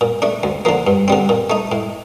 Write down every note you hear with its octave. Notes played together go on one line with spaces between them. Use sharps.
A#2
A3 D4
D2
D3 F3 A#3
G2
D3 G3 C4
A#2
A3 D#4
A2